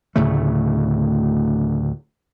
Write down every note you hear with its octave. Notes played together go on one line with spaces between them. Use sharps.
D2 A2 C#3 A3